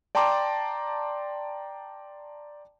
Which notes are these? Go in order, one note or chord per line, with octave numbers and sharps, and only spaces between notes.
D5 G5 A5 A#5 C6 D6